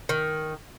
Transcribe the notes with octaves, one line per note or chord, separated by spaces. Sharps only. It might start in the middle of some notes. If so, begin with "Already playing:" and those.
D#3